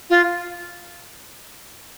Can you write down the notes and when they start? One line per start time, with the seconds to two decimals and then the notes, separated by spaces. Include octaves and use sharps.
0.10 F4